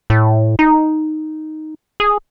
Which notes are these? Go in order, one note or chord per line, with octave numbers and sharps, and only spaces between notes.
A2
D#4
G#4